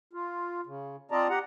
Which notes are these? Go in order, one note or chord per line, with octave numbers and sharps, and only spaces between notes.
F4
C#3
C4 F4 D5 D#5 A5 A#5
G4 F#5 A#5